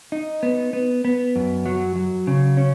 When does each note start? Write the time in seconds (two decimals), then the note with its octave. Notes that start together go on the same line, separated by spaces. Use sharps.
0.12 D#4
0.43 B3
0.73 B3
1.05 B3
1.36 F#2
1.66 F#3
1.96 F#3
2.27 C#3
2.57 C#4